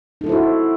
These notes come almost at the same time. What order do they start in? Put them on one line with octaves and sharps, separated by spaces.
D#4 A4 E4 C5 F#4